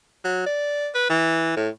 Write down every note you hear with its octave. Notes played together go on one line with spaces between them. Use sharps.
F#3
D5
B4
E3
A2